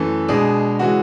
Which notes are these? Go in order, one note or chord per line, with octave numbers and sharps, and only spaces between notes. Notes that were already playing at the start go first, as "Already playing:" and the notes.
Already playing: F#2 E3 A3
B2 G#3 D4 G#4
C#3 E3 G#3 F#4